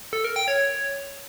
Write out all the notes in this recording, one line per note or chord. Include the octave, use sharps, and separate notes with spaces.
A4
A#4
G5
C#5